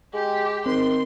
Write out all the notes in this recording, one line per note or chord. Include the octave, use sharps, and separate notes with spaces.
G#3 G4
D#3 C4 C6